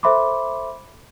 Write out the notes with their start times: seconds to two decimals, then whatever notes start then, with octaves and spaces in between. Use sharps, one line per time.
0.03 A4 C5 E5 B5 C6 D6